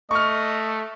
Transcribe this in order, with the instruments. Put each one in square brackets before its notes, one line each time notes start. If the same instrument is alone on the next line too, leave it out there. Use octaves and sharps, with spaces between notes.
[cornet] A3 [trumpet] D#5 [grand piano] C#6 F6